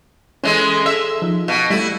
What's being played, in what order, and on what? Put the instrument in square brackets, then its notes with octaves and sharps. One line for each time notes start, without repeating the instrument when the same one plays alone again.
[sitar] E3 G#3 [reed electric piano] C#4 A4
[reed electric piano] A4 [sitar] E5
[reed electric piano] F3 D#4
[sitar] B2 [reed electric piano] F5
[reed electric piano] G3 A3 [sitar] E4